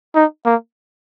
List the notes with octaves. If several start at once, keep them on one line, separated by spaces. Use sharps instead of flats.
D#4
A#3